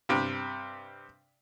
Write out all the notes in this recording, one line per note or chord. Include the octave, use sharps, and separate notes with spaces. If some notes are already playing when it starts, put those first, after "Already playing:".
G2 C3